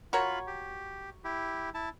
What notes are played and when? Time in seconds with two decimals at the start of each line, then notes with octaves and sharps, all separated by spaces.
0.13 F4 F#4 A#4 C#5 B5
0.47 G4
1.24 E4 G4
1.74 E4 A5